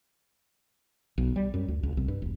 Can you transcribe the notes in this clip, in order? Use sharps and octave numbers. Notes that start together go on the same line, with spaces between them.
B1
G3
F#2
D2
C#2
C2
G2
E1